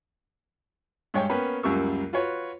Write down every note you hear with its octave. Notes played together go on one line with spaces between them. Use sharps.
G2 G#3 C#5 G5 G#5
A#3 B3 C#4 B4 G5
C#2 F#2 G3 A#3 C#6 E6
F4 F#4 B4 C#5